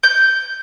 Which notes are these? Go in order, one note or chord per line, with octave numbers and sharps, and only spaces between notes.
G6